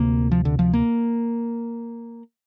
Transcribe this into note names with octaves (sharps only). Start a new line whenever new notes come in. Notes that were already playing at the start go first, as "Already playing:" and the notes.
Already playing: D2 C3 A#3
F3
D3
F3
A#3